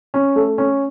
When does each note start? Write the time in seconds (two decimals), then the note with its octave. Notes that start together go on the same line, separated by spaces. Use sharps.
0.14 C#4
0.36 A3
0.58 C#4